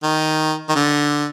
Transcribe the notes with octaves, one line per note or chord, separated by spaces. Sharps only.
D#3
D#3
D3